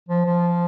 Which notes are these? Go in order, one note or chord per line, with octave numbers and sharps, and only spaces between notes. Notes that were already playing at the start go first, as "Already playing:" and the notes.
F3
F3